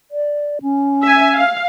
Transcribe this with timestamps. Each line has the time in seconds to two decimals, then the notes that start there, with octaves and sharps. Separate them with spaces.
0.11 D5
0.62 C#4
1.03 E5 G#5
1.35 F5